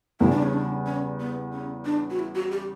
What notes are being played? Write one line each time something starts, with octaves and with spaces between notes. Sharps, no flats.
E2 C#3 G3 E4
D4
C#4
D4
C#4
B3
C#4
D4
F#4
E4
F#4
G4